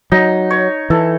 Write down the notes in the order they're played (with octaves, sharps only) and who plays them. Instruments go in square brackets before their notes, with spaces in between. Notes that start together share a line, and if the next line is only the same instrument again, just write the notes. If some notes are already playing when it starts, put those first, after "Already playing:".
[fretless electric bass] F#3 [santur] D#4
[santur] C#5
[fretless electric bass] E3 [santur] A4